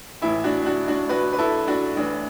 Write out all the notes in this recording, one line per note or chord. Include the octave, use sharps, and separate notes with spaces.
A1 A2 E3 E4
D4 F#4
D4 F#4
D4 F#4
F#4 B4
B4
E4 A4
D4 F#4
A1 A2 E3 D4